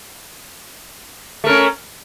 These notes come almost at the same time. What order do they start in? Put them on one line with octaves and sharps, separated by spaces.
A3 A#4 C#4